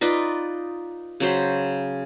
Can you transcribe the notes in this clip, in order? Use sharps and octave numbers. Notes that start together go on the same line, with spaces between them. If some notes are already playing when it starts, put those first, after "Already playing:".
D#4 F4 B4 D5
C#3 F#3 C5 B5